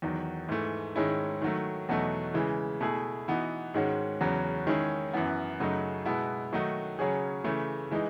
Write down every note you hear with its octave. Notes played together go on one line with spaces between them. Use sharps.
E2 D#3 F#3
G#2 E3 A3
G#2 D#3 G#3 C#4 E4
D#3 F#3 A3
E2 B2 F#3 A3 D#4
C#3 E3 G#3
B2 A3 E4 G#4
E3 B3 D#4 F#4
G#2 D#3 G#3 C#4 F#4
E2 C#3 F#3 C#4 F#4
D#3 G#3 C#4 E4 G#4
F#2 E3 B3
F#2 C#3 F#3 A3 D#4
B2 G#3 B3 E4
D#3 F#3 A3 D#4 F#4
C#3 F#3 C#4 G#4
C#3 E3 A3
E3 G#3 D#4